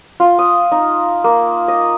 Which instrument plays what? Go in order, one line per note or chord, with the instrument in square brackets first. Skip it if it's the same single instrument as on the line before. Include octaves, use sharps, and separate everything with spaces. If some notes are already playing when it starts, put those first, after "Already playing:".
[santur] F4
D#6
D#4
A#3
D#5